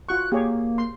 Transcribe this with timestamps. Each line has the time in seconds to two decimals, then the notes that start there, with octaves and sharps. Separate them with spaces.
0.09 F4 F#4 C#6 F#6
0.32 A#3 G4 G#4 C#5
0.78 C6